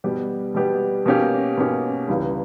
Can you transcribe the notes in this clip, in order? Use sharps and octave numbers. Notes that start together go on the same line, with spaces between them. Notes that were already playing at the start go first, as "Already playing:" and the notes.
B2 G3 B3 G4
B2 G3 B3 G4
B2 A#3 C#4 G4
B2 A#3 C#4 G4
C#2 C#3 E3 G3